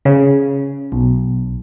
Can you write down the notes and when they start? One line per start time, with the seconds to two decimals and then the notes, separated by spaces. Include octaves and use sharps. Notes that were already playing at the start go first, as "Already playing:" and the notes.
0.05 C#3
0.92 B1